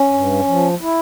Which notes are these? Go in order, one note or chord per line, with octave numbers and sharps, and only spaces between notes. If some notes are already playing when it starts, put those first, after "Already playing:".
Already playing: C#4
G2
F3
E4